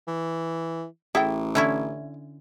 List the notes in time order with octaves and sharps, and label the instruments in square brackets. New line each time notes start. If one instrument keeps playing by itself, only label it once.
[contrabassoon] E3
[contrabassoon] A1 [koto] E4 [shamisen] G#4 A4 G5
[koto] D3 C#4 E4 [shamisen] D5 E5 B5